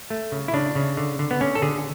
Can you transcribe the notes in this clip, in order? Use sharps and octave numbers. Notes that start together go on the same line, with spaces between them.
A3
C#3
E4
C#3 D4
C#3
D3
D3
B3
D3 C#4
A4
D3 G#4